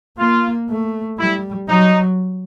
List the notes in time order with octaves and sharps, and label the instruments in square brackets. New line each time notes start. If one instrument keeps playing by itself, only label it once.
[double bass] A#3 [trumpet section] F4
[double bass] A3
[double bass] G3 [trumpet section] E4
[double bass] F#3 [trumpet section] D#4